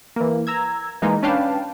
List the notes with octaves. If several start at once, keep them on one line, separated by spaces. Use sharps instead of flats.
E3 A#3
A#5 E6 G#6
E3 G#3 A#3 D#4
C#4 D4 B4 F5 G5 A5